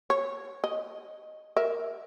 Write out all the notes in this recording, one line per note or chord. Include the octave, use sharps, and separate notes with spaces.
C#5
D#5
A#4 E5